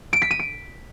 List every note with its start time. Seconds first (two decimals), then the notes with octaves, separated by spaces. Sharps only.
0.13 D7
0.22 B6
0.31 D#7
0.39 D7